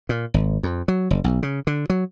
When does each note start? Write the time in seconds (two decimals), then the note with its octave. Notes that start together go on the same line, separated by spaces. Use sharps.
0.09 A#2
0.34 G#1
0.63 F2
0.88 F#3
1.11 F#1
1.24 B1
1.43 C#3
1.67 D3
1.90 F#3